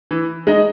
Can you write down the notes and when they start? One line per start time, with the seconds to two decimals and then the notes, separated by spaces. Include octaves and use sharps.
0.11 E3
0.47 G#3 D#4